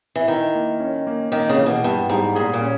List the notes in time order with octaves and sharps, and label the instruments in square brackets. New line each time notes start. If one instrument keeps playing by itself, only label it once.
[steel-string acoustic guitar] E3
[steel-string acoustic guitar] D#3 [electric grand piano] E4
[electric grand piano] A#3
C#4
A#3
[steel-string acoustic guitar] D#3 [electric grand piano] A#3
[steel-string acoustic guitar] C#3
[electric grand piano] E3
[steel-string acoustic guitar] B2
[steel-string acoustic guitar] G2 [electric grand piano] B3
[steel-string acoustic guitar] G#2 [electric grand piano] G3
[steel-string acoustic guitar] A#2 [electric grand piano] G#4
[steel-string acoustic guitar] A#2
[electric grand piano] C#4